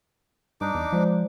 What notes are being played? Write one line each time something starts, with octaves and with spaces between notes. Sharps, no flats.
G2 D4 D#4 D6
E2
F3 G#3 C5 D5